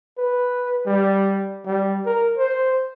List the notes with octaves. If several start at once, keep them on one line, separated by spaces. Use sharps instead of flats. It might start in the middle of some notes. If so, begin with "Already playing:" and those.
B4
G3
G3
A#4
C5